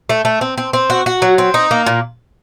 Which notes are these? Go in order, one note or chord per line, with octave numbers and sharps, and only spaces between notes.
A3
A3
C4
C4
C4
F#4
F#4
F#3
C4
D#4
A#3
A#2